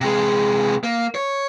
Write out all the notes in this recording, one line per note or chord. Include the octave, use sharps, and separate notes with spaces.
C3 G#3
A#3
C#5